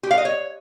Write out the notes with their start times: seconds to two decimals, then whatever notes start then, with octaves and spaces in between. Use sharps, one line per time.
0.03 G4
0.11 F5
0.18 D#5
0.25 C#5